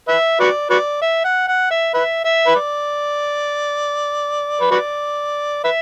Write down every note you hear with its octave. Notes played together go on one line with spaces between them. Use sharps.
B4 E5
F#4 B4 D5
F#4 B4 D5
E5
F#5
F#5
E5
B4 E5
E5
B4
D5
B4
F#4 B4 D5
B4 E5